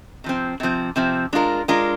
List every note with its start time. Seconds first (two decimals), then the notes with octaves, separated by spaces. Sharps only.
0.24 C3 F3 C4
0.60 C3 F3 C4
0.96 C3 F3 C4
1.33 G#3 D4 F4 A#4
1.68 G#3 D4 F4 A#4